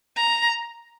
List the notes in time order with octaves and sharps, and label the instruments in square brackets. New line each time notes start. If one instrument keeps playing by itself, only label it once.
[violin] A#5